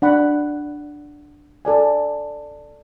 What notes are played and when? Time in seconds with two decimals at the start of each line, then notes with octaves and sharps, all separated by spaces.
0.02 D4 F#5 B5
1.65 A4 D5 G#5